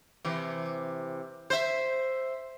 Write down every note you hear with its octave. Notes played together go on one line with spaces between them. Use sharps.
C3 E3
C5 E5